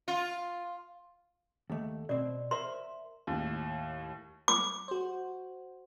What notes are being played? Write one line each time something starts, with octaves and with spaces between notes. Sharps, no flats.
F4
D#2 A3
B2 C4 D5
A#4 C5 E5 C6
D#2 A2
D6
F#4 C5